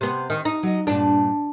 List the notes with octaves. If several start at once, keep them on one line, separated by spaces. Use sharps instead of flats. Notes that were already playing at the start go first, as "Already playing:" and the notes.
C3 B3
D#3
D#4
F#3 D#5
G2 A#2 D4